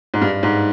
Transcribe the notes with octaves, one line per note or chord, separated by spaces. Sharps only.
G#2
G2
G#2